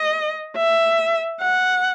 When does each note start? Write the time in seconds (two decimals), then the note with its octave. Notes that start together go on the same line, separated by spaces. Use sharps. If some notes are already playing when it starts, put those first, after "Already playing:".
Already playing: D#5
0.57 E5
1.41 F#5